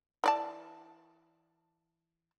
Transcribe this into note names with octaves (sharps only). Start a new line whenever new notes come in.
E3 D5 A5